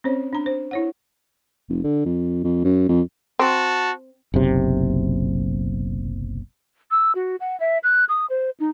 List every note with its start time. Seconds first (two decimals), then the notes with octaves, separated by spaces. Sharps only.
0.04 C4 C#4 C5 C#5
0.33 D4 A#5
0.46 C5
0.71 E4 C#5 F#5
1.69 F1
1.84 D3
2.06 F2
2.44 F2
2.64 F#2
2.89 F2
3.39 C4 F#4 A5
4.34 F#1 B1 C3
6.91 E6
7.15 F#4
7.40 F#5
7.60 E5
7.83 F#6
8.09 D#6
8.30 C5
8.60 D#4